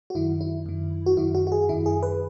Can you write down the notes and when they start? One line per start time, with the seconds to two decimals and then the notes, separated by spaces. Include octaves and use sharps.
0.10 F#4
0.15 F#2 D#3 E4
0.41 E4
0.66 F#2 D#3
1.06 F#4
1.17 F#2 D#3 E4
1.35 F#4
1.47 F#4
1.52 G#4
1.69 F#2 D#3 E4
1.86 G#4
2.03 B4